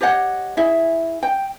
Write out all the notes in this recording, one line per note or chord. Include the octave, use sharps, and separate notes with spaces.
G4 C#5 D#5 F#5
E4 G#4 E5
G5